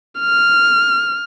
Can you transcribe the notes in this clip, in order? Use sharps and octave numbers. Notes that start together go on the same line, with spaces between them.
F6